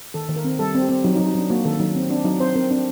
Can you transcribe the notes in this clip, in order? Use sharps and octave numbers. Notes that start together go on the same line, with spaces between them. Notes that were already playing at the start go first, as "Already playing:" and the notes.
D#3 A4
D#3
A#4
C4
G3 A4
C4
G4
C4
F#3 D#4
D#4
F#3
D#4
F#3 D4
A#3 F#4
D#3 A4
F#3 D#4
C4
C4 D4
F#3 D#4
C4 C5
C4 A#4
C4 D4